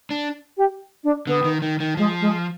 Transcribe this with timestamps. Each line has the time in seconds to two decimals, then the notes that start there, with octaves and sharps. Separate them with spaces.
0.11 D4
0.57 G4
1.04 D4
1.27 D3 B3
1.44 D#3
1.62 D#3
1.80 D#3
1.97 F3 G#3
2.21 G#3